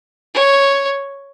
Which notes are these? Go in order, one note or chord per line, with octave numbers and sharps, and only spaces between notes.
C#5